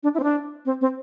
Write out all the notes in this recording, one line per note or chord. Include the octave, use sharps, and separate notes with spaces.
D4
E4
C4
D4
C4
C4